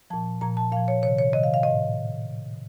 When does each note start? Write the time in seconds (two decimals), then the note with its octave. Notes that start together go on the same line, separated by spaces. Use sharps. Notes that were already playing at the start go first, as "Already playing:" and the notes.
0.10 A#2 F3 A5
0.41 A#2 F3 A#5
0.57 A5
0.72 A#2 F5
0.76 F3
0.88 C#5
1.02 C3 C#5
1.06 D#3
1.18 C#5
1.33 C3 D#3 D#5
1.43 F5
1.54 F5
1.63 A2 D#5